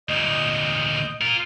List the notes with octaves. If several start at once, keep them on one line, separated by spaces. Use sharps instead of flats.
D2 A#2 D#5 G6
F4 A#4